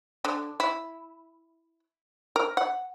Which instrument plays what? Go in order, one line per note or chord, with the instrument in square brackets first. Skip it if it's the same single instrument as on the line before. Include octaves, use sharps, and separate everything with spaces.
[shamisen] D3
E4
A#4
F#5